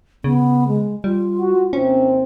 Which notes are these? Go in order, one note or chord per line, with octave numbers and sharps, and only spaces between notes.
C#3 B3
G#3
G3 F4
F#4
D#2 C3 C4 C#4